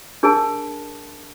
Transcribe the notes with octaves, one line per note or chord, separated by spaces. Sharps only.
D4 G#4 A#4 G#5 A5